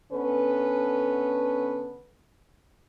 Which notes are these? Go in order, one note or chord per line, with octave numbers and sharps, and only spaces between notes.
D3 B3 C#4 A4 B4